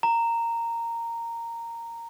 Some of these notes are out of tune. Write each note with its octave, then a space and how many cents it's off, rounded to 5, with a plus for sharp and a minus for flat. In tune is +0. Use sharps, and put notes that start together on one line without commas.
A#5 -10